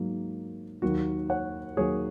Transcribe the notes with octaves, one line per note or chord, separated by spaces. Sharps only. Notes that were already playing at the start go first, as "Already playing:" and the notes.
Already playing: G#2 F#3 A#3
D#2 D#3 F#3 A#3 F#4
C#5 F#5
D#2 D#3 F#3 A#3 G#4 C#5